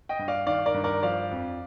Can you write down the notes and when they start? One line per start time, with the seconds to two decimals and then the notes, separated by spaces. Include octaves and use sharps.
0.09 D#5 G5
0.19 G2
0.28 D5 F5
0.47 D#3 D5 F5
0.66 A#4 D5
0.74 G2
0.84 A#4 D5
1.03 F3 D5 F5
1.31 F2